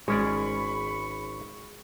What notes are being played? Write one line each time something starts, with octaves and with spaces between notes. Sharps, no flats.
G#1 G#3 C#4 D5 B5 C#6